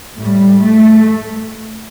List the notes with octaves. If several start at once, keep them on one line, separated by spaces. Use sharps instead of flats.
A2 G3
A3